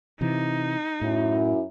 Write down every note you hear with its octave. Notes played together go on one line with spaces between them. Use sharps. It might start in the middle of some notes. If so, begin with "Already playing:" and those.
C3 E3 D#4
F#2 A2 E4